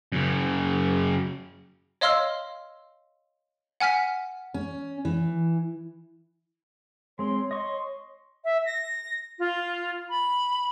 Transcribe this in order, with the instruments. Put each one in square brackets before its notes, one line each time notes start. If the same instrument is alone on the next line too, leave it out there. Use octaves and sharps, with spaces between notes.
[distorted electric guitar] F#2 C#3
[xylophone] C#5 D#5 F5 C6 E6 F6
F#5 G#5 F6 B6
[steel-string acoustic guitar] C#4
E3
[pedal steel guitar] G#3 C4 [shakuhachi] C#5 [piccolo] C6
[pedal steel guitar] D#5 C#6 [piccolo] C6
[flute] E5
A#6
F4
B5